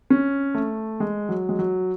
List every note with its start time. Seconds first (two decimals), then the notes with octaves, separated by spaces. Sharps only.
0.10 C#4
0.54 A3
1.00 G#3
1.29 F#3
1.49 G#3
1.59 F#3